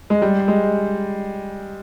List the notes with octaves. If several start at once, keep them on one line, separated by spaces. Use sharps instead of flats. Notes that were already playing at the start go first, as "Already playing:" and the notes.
G#3
G3
G#3